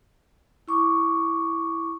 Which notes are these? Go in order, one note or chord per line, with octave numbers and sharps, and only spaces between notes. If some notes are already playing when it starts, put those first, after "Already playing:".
E4 C#6 D6